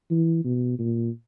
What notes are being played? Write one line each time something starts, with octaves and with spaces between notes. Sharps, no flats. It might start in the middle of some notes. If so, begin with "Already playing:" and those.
E3
B2
A#2